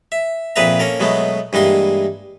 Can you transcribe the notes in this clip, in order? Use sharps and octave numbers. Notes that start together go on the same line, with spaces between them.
E5
F2 A#2 G#4 B4 E5 A#5
A#3 C#4 A4 A#4
B2 F#3 G#3 A3 B3
G2 E3 G#3 A#3 C6